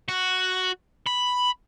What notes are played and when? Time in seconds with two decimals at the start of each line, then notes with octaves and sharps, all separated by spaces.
0.09 F#4
1.06 B5